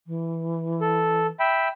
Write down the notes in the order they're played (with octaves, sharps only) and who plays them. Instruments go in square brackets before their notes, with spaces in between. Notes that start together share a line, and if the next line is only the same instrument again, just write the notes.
[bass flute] E3
[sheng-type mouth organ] A4
E5 G5 B5